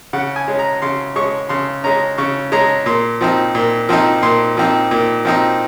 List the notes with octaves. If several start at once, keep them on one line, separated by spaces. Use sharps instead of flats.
C#3 F#5
G#5
G#3 C#4
A#5
C#3 C6
G#3 C#4 C#6
C#3 C6
G#3 C#4 A#5
C#3 C#6
G#3 C#4 A#5
A#2 C6
F3 C4 D#4
A#2
F3 C4 D#4
A#2 C6
F3 C4 D#4
A#2
F3 C4 D#4